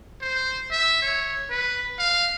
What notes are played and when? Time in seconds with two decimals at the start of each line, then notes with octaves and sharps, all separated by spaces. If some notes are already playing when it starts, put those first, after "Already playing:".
0.21 C5
0.71 E5
1.02 C#5
1.50 B4
1.99 F5